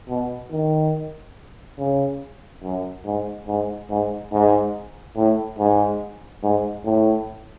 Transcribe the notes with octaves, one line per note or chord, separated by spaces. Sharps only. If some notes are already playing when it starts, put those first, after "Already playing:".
B2
D#3
C#3
F#2
G#2
G#2
G#2
G#2
A2
G#2
G#2
A2